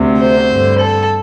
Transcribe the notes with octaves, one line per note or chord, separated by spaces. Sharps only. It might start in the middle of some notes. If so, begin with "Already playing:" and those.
Already playing: D2 C3
C5
G2 D3
A4